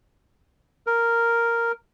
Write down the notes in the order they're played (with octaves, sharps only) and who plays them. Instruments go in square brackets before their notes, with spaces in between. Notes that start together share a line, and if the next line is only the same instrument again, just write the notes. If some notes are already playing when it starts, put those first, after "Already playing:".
[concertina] A#4